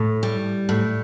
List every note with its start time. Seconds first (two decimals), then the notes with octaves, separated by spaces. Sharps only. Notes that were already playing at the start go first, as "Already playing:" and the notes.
Already playing: A2
0.23 G3
0.69 A2